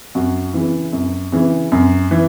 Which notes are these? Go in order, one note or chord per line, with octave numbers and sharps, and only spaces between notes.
F#2 F#4
C#3 E3 E4
F#2
C#3 E3
F#2
E3